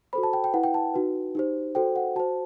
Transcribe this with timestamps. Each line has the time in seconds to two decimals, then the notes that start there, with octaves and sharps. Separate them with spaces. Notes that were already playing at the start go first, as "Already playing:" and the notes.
0.13 F#4 A4 C5 B5
0.23 A5
0.33 G5
0.44 G5
0.54 E4 B4 F#5
0.64 G5
0.74 A5
0.94 D#4 F#4 B4
1.35 D#4 G4 C5
1.75 F#4 A4 C5 G5
1.96 F#5
2.16 F#4 C5 A5